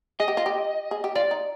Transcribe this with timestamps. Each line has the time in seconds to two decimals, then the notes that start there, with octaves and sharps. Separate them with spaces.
0.20 G#4 D#5
0.28 G4
0.37 F4
0.46 G4
0.91 G#4
1.04 G4
1.15 F4 D5
1.31 D#4